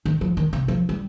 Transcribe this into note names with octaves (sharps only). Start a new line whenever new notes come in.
D#3
F3
D#3
C3
F3
G3